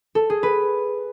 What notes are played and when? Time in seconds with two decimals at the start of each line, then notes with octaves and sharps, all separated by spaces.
0.15 A4
0.30 G#4
0.43 B4